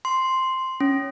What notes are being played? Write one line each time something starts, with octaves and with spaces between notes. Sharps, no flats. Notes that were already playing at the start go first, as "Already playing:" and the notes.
C6
C#4